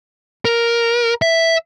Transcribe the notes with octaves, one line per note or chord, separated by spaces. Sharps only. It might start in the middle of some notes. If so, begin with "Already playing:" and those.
A#4
E5